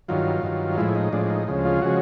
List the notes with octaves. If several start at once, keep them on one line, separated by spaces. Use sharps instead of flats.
G2 D#3 F#3 F4
G2 D#3 F#3
A2 F3 G#3 E4
D#4
A2 F3 G#3 D4
D4
D#4
D2 C#3 F3 G#3
F4
C#3 F3 G#3 F#4